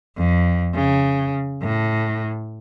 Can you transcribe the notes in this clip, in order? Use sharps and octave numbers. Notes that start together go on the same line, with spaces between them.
F2
C#3
A2